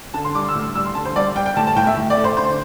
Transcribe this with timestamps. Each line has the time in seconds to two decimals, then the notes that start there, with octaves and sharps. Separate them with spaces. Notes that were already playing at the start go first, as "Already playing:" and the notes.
0.14 D3 A5
0.24 C6
0.35 G3 D6
0.48 E6
0.55 A2
0.62 E6
0.75 G3 E6
0.85 C6
0.95 D3 A5
1.05 C5
1.16 G3 D5
1.35 G3 G5
1.46 G5
1.56 A2 A5
1.67 A5
1.76 A2 G5
1.87 E5
1.97 A2
2.10 D5
2.17 A3
2.24 C5
2.37 D3 C5